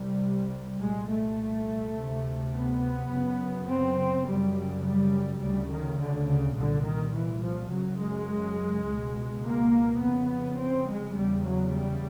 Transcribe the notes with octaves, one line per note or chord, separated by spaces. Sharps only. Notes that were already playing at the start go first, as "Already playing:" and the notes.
Already playing: C2 C3 G3
C2 A#2 G#3
A3
D2 C3
B3
F#2
C#3
C4
F#2 C#3 G3
G3
D2 C#3 G3
D#3
D3
C#3
C2 A#2 D3
D#3
E3
F3
F#2 C#3 F#3
G#3
C#2 B2
A#3
F2 C#3 B3
C4
G#3
E2 C#3 G3
F#3
G3